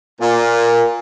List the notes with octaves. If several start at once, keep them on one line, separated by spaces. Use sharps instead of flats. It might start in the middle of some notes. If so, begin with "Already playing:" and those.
A#2